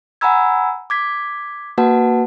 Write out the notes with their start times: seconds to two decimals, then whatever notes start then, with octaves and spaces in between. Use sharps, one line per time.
0.21 F#5 G#5 A#5 B5 E6 G#6
0.90 D6 G#6 B6
1.78 A#3 F#4 B4 F#5 A5